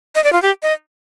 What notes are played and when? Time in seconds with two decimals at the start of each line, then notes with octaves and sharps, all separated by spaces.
0.15 D#5
0.24 D5
0.33 F4
0.42 G4
0.63 D#5